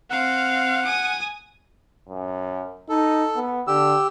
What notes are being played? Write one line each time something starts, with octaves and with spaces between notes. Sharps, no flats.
C4 F5 F#5
G#5 D#6
F#2
D#4 A4
B3
D3 G4 E6